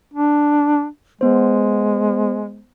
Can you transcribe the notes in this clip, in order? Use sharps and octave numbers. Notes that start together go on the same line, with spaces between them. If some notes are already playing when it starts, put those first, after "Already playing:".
D4
G#3 B3 C5